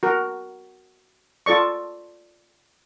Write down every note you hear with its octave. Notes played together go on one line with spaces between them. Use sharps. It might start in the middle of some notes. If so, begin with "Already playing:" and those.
F#4 A#4
F4 A4 D5 C#6